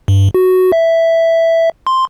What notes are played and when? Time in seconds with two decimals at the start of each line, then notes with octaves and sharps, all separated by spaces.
0.08 G2
0.34 F#4
0.72 E5
1.87 C6